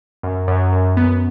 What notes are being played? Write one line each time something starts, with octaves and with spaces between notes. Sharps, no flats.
F#2
F#2
F#2
B3